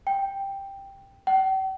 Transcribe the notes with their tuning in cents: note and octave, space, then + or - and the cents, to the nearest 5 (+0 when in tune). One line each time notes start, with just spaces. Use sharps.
G5 +5
G5 -45